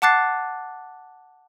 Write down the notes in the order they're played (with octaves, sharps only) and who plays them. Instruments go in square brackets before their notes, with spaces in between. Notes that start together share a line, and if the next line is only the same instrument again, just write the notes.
[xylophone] F#5 A5 D6 F#6 A6 C7